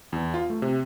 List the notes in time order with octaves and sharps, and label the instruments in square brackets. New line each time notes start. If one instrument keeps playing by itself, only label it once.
[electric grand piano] E2
F4
A3
C3